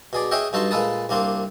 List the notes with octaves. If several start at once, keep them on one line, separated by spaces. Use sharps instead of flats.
B2 G#4 D5
G#4 C#5 D#5 E5 F#5 G5
G2 D#4 F#4 A4 A5 C6
A#2 G#3 A4 B4 A5 D#6
C2 A#3 C4 D4 C6